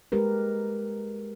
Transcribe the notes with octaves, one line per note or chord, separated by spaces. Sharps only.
G#3 G4 A#4 B4